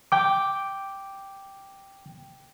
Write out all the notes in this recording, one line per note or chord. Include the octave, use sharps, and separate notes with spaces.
G5 D6